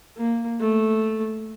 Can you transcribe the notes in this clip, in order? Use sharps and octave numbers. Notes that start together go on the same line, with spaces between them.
A#3
A3